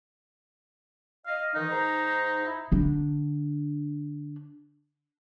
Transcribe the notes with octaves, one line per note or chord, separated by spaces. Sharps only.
D#5 F5
D#3 E3 D#4
G#2 C5 A#5
E4
D3 D4